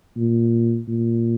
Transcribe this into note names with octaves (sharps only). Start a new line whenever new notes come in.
A#2
A#2